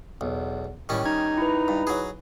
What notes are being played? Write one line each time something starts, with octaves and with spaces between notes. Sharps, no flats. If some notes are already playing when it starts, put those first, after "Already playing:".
B1 E2
A2 D#3 G3 C#4
D#4 G#6
E4 B4
G2
F#3 G#4